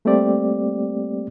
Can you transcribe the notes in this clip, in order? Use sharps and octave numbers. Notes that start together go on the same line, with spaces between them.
G3 A3 A#3 C4 G4 D5